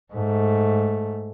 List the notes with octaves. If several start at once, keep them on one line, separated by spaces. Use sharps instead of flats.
G#2 A3